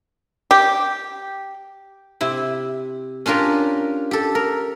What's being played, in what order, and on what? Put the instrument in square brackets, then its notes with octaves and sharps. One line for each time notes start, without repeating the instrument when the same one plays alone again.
[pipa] G4
[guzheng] C3 E4
C#4 D4 F4 G4 A#4
G4 A4
A#4